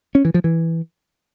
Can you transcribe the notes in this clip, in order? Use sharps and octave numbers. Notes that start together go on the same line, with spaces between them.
C#4
E3
F3
E3